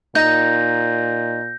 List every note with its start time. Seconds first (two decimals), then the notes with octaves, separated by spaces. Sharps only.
0.15 A#2 D#4 G6 A#6